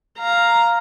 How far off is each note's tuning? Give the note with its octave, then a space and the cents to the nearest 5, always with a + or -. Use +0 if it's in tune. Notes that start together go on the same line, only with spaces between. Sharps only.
F5 +0 A#5 +0